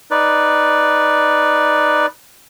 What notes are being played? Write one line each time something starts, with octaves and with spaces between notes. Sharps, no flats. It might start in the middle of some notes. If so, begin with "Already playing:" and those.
D#4 B4 D5